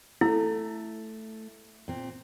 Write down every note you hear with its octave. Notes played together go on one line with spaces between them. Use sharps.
A3 E4
A#2 C4